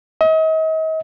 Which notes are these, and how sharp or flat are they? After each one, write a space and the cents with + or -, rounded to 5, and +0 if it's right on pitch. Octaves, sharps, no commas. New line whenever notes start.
D#5 +40